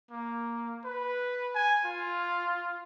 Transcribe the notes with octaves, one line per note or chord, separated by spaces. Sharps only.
A#3
B4
G#5
F4